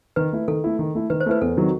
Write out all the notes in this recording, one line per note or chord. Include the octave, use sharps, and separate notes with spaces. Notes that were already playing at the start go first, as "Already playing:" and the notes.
D#3 B4
A3 E4
D#3 A4
A3 E4
D#3
A3 E4
D#3 B4
C5
A3 E4 B4
E2 A4
D#3 F#3 C4 D#4